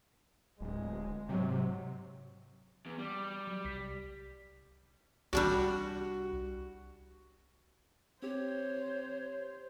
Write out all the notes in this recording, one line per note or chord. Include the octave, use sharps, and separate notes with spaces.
D1 G#3
G#2 C3 F#3
E2
G3
F#3
C2 B6
C2 G3 D4 F#4 D5
C4 G4 C5 C#5